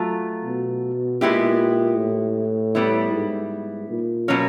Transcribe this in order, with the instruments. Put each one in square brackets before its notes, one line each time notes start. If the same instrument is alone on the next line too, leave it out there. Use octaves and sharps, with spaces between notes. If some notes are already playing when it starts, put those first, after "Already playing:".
Already playing: [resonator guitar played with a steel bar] F#3 A3 F4
[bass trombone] B2
[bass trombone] A#2 [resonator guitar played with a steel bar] G#3 B3 E4 G4
[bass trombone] A2
[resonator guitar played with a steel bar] G3 B3 E4
[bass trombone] G#2
A#2
[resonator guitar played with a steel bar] B2 F#3 A#3 C#4